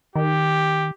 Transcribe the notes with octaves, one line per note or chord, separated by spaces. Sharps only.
D#3 G4